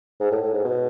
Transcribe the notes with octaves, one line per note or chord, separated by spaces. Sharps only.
G#2
A2
A2
G#2
B2